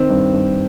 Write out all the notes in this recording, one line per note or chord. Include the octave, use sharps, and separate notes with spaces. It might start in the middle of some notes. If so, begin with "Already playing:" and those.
Already playing: D#3 C4
G2
G2